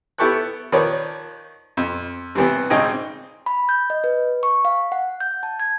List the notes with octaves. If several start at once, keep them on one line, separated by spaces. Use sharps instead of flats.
B3 E4 G4 A4 C#6 F#6
D#3 F3 B4 C#5 D5
F2
G2 C3 E3 B3
G#1 C#3 C4 D#4 G5 G#5
B5
G6
D#5
B4
C#6
F5
F#5
G6
A5
G#6